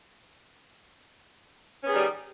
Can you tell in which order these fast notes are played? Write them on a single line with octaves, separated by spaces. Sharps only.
C#4 B3 G#4 D#3 G3